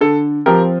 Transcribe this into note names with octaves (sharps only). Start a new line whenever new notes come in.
D3 A4
F3 C4 G4 A#4